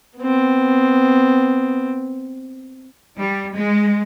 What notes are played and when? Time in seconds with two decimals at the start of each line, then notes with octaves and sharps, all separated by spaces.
0.18 B3 C4
3.18 G3
3.54 G#3